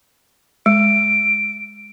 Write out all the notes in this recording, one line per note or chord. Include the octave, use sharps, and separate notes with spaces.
G#3 D7